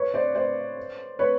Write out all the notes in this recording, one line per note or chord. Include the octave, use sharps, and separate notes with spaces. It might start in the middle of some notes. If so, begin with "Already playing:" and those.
Already playing: B4 C#5
C5 D5
C5 D5
B4 C#5